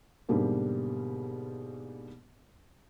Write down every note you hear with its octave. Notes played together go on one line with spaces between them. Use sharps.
G#2 B2 D3 G3 A#3